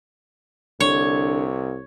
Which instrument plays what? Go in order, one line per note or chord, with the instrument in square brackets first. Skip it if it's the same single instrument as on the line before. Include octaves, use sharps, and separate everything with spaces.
[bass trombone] C2 [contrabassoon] D3 [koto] C#5